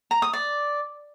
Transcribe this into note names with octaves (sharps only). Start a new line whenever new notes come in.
A#5
D#6
D5